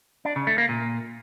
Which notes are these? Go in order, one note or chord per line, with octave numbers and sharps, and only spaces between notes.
D4
C#3
A3
A#3
A#2